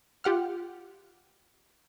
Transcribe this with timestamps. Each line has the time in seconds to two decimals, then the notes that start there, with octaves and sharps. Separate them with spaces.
0.24 F4 G4 F#5 F6